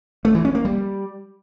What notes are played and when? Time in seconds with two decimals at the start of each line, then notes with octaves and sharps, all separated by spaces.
0.25 A3
0.35 E3
0.45 C#4
0.55 A#3
0.65 G3